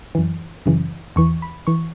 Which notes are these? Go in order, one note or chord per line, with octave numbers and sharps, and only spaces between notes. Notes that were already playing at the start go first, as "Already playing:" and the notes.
F#2 E3
F#2 C#3 E3
E2 E3 C#6
B5
E3 C#6